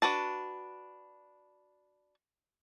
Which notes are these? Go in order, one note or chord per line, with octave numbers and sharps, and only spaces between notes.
D4 F#4 B4 A5